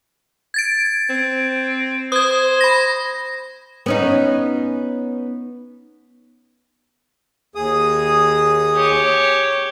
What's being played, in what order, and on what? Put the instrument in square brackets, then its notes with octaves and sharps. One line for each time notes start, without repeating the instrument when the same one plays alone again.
[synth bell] G#6 A6 D7
[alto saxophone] C4
[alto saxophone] C5 [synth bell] D#6 G#6
[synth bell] B5 A#6
[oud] B3 C#4 D#4
[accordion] D#2 G#4 D#6
[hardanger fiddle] G4 C#5